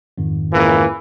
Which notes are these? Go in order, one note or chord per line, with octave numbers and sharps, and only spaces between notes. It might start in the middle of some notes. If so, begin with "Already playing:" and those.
F2 G#2 D#3
C#2 E3 A#3